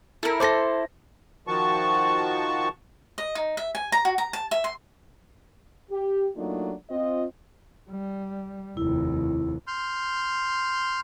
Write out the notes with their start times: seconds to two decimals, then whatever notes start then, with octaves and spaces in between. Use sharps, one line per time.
0.23 E4 A4 A#4
0.40 A4 C5 A5 C6 D6 A#6
1.47 D#3 F3 F#4 A5 C#6
3.18 D#5
3.35 D#4
3.57 E5
3.75 G#5
3.92 A#5
4.05 F#4
4.18 A#5
4.33 A5
4.51 E5
4.64 C6
5.90 G4
6.36 F#3 A3 A#3 D4 D#4 F4
6.89 C4 F4 D#5
7.90 G3
8.77 F1 D#2 E4
9.67 C6 F6 G6